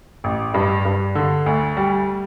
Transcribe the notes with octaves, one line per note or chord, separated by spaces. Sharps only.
A1
G2
G2
D3
D2
G3